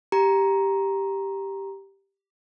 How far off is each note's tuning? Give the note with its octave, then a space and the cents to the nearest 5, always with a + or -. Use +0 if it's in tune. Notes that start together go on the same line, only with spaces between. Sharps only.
G4 +0 A#5 +10